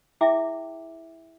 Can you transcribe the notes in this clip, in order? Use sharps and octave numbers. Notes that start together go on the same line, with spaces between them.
E4 G#4 E5 G5 D6